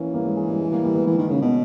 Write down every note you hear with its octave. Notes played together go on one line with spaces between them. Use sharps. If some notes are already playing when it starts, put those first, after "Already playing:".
Already playing: E3 A#3 C#4
G3 A#3
G#3
G#3
G3
G#3
G3 A#3
G3 A#3
G#3 B3
E3
D#3
C#3
B2